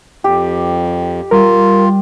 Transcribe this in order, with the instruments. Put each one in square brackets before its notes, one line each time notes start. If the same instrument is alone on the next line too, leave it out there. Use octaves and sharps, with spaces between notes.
[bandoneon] F2 [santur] G4
[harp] G3 [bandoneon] F4 [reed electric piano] A#4